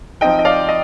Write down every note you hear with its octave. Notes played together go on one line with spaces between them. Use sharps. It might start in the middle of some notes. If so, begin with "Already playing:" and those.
F3 C4 D#4 D#5 G5
D#5
D5 F5
D#5